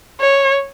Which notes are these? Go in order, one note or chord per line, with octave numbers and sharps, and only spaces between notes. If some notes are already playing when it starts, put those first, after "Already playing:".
C#5